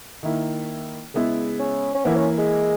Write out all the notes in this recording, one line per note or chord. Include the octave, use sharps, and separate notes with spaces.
D#3 A#3 E4
C#3 G#3 B3 E4
C#4
C#4
E3 A#3 B3 E4
C#4
G#3